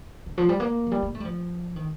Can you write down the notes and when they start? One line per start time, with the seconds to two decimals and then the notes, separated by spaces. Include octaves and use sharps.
0.26 D3
0.38 F3
0.49 G3
0.60 A#3
0.87 F3
0.91 G3
1.02 A#3
1.15 A3
1.20 G3
1.25 F3
1.76 D#3